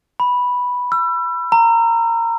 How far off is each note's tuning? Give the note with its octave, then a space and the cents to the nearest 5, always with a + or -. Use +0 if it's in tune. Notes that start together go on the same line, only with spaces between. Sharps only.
B5 -5
E6 +35
A#5 -15